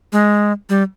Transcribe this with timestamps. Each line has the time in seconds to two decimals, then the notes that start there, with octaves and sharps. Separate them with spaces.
0.13 G#3
0.69 G3